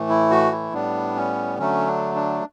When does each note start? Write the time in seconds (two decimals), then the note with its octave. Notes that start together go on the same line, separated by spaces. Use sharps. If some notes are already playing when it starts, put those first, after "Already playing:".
Already playing: A2 E3 A3
0.09 E4
0.31 F#4
0.52 E4
0.73 A2 G3 B3 D4
1.16 C#4
1.58 D3 F#3 A3 C#4
1.87 D4
2.16 D4